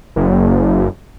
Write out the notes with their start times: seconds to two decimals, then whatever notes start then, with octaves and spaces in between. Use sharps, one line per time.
0.16 F#1